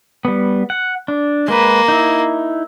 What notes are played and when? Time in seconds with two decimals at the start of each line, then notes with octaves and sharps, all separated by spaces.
0.25 G3 B3
0.70 F#5
1.08 D4
1.48 G#3 A#3 B4
1.88 D#4 E4